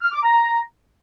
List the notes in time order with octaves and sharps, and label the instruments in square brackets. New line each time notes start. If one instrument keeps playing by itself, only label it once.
[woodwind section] F6
D6
A#5